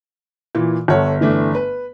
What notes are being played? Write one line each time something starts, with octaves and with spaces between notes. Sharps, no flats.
A#2 E3
G1 A4 C#5 F#5
E3 A3 D4
B4